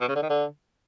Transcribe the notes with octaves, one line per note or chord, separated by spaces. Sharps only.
B2
C#3
D3
D#3
D3